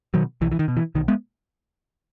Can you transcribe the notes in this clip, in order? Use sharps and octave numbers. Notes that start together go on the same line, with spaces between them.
B2 D#3 F#3
B1 E3
E3
D#3
B2
E3
B1 D#3
G#3 B3